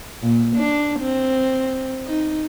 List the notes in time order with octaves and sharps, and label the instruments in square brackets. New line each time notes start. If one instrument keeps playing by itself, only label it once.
[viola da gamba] A#2
D4
C4
D#4